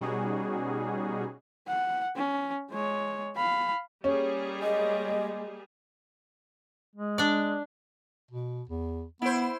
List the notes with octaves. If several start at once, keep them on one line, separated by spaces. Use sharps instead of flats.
B2 G3 C#4 D#4 F#4 G#4
F#5
C#4
G#3 C#5
F5 B5
G3 A#3 C#4 G#4
G#3 D#5
G#3
D4 D5
B2
E2
B3 E4 C5